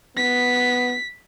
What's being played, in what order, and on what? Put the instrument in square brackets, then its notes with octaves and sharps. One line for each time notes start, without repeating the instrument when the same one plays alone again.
[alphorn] B3 [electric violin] B6